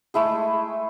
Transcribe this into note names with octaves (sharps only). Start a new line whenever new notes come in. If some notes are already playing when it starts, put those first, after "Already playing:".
G#3 A3 E4 G#4